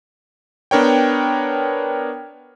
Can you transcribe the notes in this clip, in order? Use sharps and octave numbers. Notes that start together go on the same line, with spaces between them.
B3 D4 A#4 C#5 G5